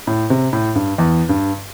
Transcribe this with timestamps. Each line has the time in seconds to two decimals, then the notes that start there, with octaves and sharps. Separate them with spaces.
0.07 A2
0.30 C3
0.53 A2
0.75 G2
0.98 E2
1.29 G2